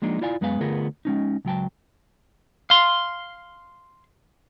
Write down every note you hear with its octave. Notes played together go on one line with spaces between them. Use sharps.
F3 G#3 A#3 D4 D#4
E4 F4 D5 F5 G#5
F#2 G#3 B3 B4 F5 G#5
D3 A3 B3 F4 G#4 A#4
G#3 C#4 D#4
C#2 F#3 G5 A5
F5 C6